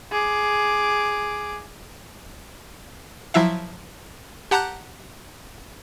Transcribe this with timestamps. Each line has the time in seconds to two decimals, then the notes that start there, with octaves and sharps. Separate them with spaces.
0.12 G#4 D6
3.34 F3 F#3 E4 E5 F5
4.51 G4 F#5 A5 A#5 F#6 G6